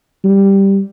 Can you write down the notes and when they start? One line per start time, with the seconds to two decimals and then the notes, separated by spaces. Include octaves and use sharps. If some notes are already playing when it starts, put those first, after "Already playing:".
0.24 G3